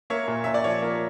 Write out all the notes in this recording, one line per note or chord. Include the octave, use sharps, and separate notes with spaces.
A#3 C#5 E5
A#2
A#2 E5
D5
F3 C#5
A#3